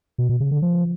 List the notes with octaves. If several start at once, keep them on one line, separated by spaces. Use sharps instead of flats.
B2
B2
C#3
D3
F3